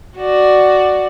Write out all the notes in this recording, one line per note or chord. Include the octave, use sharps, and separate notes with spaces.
F#4 D5